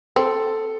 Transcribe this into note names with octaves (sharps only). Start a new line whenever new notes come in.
C4 A4